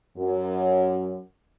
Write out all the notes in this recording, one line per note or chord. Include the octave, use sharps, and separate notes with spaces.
F#2